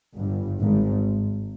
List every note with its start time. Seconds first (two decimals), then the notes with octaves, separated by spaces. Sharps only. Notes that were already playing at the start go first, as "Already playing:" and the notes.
0.15 G1 G2
0.60 G#1 G#2